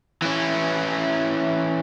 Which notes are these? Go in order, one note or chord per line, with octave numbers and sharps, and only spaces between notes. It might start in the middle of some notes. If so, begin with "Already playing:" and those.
E3 C#4